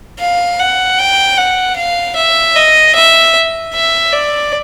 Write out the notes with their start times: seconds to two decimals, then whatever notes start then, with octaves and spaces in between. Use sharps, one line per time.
0.20 F5
0.60 F#5
0.99 G5
1.37 F#5
1.76 F5
2.16 E5
2.56 D#5
2.95 E5
3.74 E5
4.12 D5